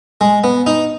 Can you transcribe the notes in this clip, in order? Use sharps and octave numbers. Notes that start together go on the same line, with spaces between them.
G#3
B3
D#4